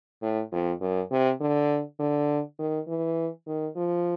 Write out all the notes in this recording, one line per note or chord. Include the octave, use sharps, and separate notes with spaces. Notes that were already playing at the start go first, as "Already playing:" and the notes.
A2
F2
F#2
C3
D3
D3
D#3
E3
D#3
F3